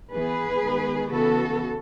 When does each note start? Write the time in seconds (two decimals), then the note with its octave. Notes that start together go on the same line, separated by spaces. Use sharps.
0.13 E3 B3 G#4 B4
0.62 D#3 G#3 B3
1.10 C#3 E3 B3 F#4 A4